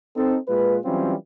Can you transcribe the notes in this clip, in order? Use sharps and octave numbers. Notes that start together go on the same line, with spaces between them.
C4 D#4 A4
A#2 G#3 F4 B4
E3 F#3 G3 C4 C#4 F4